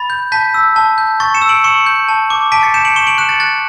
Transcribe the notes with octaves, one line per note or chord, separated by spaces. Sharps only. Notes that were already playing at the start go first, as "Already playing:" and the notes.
Already playing: B5 A6
G6
A5 G6 B6
E6
A5
G6
C#6 A6
C#7 E7
E6
D7 F#7
C#6 C#7 E7
G6
A5
D6
A5 B6 D7
A6 C#7
G6 C#7 E7
D7 F#7
C#6 E7 G7
D7 F#7
F#6 C#7 E7
A6
F#6 A6